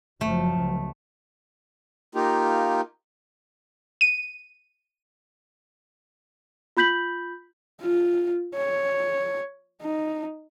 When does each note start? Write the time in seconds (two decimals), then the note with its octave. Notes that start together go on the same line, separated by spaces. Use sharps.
0.21 F#1 F3 F#3 A3
0.58 C#2
2.15 A#3 D#4 F4 G4
4.01 D#7
6.77 F4 B5 G6 B6 F#7
7.81 F4
8.55 C#5
9.82 D#4